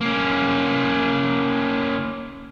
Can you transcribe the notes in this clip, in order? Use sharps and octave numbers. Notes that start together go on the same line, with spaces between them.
A#3 C#4